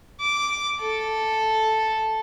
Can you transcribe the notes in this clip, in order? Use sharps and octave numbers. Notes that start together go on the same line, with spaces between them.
D6
A4